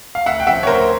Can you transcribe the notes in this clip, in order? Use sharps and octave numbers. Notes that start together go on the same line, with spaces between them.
F5
D2 E5 F#5
G5
C#3 F3 E5 F#5
C#5
D2 A#4 C5